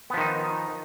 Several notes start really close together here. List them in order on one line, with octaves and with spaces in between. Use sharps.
B3 F3 D#3 D#4